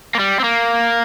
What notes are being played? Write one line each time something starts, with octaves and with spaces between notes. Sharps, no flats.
A#3
G3
C4
A#3